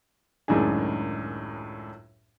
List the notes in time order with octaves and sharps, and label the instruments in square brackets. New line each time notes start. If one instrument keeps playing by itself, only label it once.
[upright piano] C#2 F#2 A2 D#3 D4 G#4